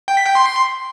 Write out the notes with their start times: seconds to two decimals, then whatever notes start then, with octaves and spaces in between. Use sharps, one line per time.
0.08 G5
0.17 B6
0.26 G5
0.35 C6